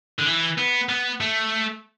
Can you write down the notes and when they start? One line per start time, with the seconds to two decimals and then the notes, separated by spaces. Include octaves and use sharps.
0.19 D3
0.26 E3
0.58 B3
0.89 B3
1.21 A3